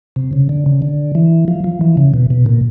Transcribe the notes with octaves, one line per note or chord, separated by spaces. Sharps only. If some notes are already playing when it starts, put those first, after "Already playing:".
C3
C#3
D3
C#3
D3
E3
F3
F3
E3
C#3
B2
B2
A#2